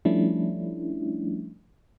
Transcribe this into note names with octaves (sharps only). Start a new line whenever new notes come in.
F3 G3 A3 C#4 D4 E4